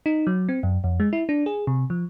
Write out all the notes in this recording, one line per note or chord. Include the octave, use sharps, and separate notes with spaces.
D#4
F#3
C4
F#2
F2
G#3
E4
D4
G#4
C3
F3